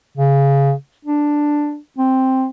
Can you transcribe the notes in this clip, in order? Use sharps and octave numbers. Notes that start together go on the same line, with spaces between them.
C#3
D4
C4